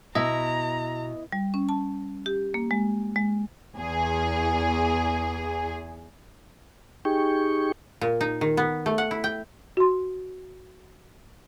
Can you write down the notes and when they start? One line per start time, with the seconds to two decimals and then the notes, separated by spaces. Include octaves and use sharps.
0.15 B2 E4 D#5 A#5
1.32 G3
1.54 C#4
1.69 A5
2.26 G4
2.54 A#3
2.71 G#3
3.16 G#3
3.77 E2 G#4
7.05 D#4 G4 G#4 G5 C#6
8.01 A#2
8.21 D#4
8.41 D#3
8.57 B3
8.86 A3
8.98 F#5
9.11 E4
9.24 G5
9.77 F#4 C6